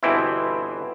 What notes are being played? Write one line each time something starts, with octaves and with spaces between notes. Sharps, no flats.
G1 B2 E3 C4 E4